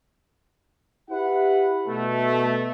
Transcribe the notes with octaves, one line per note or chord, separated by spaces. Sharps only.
E4 G4 B4 F#5
B2 A3